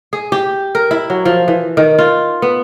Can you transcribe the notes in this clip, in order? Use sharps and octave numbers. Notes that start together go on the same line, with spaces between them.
G#4
G4
A#4
E4
F#3
F3
E3
D#3
F4
B3